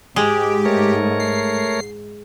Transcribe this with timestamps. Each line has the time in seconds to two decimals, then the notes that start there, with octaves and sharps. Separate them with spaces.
0.16 G#2 G#3 G4
0.65 A3 A#4 C#5
1.20 C7